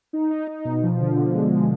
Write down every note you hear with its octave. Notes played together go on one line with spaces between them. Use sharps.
D#4
D#4
D#4
B2
F3
D3
D3
G#3